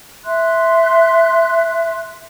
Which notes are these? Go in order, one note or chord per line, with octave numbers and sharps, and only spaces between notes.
E5 C6 F#6